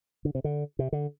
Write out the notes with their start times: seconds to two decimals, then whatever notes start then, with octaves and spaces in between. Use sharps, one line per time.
0.25 D3
0.35 C3
0.44 D3
0.79 C3
0.93 D3